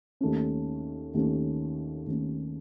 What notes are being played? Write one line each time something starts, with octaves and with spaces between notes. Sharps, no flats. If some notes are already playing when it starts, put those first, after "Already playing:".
D#2 D#3 A3 C#4
D#2 D#3 A3 C#4
D#2 D#3 A3 C#4